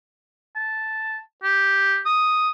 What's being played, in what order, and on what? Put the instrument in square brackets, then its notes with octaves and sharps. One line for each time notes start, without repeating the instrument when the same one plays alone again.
[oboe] A5
G4
D#6